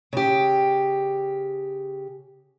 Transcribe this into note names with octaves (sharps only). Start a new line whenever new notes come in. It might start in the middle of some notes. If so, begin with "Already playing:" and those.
C#3 G4